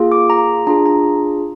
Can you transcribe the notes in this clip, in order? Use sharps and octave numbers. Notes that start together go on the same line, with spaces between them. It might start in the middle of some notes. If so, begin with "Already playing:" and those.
Already playing: A#3 F4 G#4
D6
A#5
D4 F4 G#4 A#5
A#5